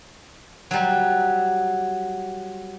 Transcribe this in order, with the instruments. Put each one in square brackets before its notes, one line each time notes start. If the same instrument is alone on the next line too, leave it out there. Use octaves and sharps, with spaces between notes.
[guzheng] F#3 G3